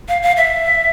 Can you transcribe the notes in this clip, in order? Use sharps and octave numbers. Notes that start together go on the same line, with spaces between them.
F5
F5
E5